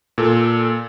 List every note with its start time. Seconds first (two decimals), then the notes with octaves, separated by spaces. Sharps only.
0.18 A#2 A4